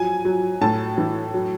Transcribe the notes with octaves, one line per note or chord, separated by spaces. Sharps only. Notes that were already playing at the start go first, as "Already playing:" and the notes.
Already playing: F3 F#3 G#5
F#3
A2 A5
E3
F#3